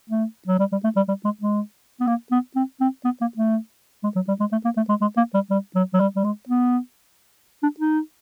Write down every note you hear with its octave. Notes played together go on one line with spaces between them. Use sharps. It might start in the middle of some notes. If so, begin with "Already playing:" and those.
A3
F#3
G3
G3
A3
G3
G3
G#3
G#3
B3
A#3
B3
C4
C4
B3
A#3
A3
G#3
F#3
G3
G#3
A3
A#3
A3
G#3
G#3
A#3
G3
G3
F#3
F#3
G3
G3
G#3
B3
D4
D#4